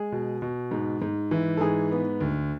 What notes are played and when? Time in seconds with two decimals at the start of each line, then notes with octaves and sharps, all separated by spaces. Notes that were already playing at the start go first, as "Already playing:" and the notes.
Already playing: G#3 G#4
0.12 B2
0.42 B2
0.71 G#2
1.02 G#2
1.31 E3
1.57 A4
1.61 G#2 G#4
1.91 B3
2.20 D2